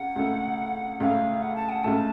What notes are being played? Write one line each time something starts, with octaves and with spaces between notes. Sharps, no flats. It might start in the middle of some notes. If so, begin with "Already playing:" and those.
Already playing: C#2 C#3 F#5
C#2 C#3 A3
C#2 C#3 A3 F5 F#5
F#5
A5
F#5
C#2 C#3 A3 A5